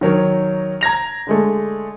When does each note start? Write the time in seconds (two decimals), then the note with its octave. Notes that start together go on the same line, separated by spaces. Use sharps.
0.01 D#3 F#3 A#4 C#5
0.81 A#5 G#6 A#6 F7
1.27 D3 G#3 A3